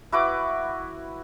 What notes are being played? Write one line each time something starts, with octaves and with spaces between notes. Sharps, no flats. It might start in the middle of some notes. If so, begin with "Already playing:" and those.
E4 F#4 B4 D6